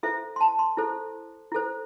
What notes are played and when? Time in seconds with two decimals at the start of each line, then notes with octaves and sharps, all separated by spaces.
0.03 E4 A4 C5 E5
0.36 C6
0.41 A5
0.59 C6
0.77 E4 A4 C5
1.52 E4 A4 C5